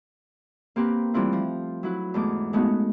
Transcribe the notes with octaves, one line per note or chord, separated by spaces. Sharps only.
A#3 C4 G4 A#4 B4
E3 G3 A3 C4 E4 F4
F3
F#3 E4 B4
E2 G#2 A3 D6
G#3 A3 B3 C#4 D#4 F#4